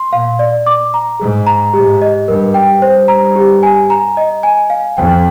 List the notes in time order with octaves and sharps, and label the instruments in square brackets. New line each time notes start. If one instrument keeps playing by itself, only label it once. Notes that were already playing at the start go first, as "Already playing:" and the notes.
Already playing: [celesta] C6
[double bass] A#2 [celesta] F5
[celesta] D5
D6
A#5
[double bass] G#2 [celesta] G#4
[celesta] A#5
[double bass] G#2 [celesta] G4
[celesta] D#5
[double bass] G2 [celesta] A#4
[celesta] G5
[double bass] G2 [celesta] C5
[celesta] A#5
G4
G#5
A#5
D#5
G#5
F5
[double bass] F2 [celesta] G5